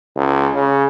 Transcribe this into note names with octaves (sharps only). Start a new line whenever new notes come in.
C#2
C#3